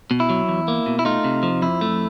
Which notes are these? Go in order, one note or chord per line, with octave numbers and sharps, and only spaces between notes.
B2
E4
F#3
E2
A#3
B2
E4
A3 D#4 F4
C3
F3
F2 E4
A3